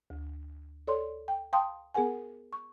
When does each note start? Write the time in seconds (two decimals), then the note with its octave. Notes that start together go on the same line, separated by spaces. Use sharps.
0.10 D2
0.87 A4 C#5 D5 C6
1.28 G5
1.53 F5 G5 A5 C6 D#6
1.94 B3 G#4 A#4 F#5 G#5
2.53 C#6